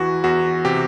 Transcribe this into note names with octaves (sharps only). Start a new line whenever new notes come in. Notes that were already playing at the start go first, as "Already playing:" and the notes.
Already playing: E2 E3 F#4
E2 F#4
C3 G4